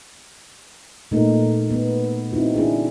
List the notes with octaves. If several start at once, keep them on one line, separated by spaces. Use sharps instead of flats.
A#2 A3 B3 D#4 A#4
B3
C4 D#4 E4 F#4
D4 E4 G#4